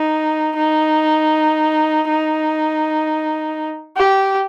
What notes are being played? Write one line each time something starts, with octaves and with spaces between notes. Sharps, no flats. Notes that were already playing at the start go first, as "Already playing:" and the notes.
Already playing: D#4
D#4
D#4
G4